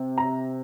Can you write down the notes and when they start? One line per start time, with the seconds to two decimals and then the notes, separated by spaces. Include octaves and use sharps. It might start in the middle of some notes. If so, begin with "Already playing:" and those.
Already playing: C3
0.18 A#5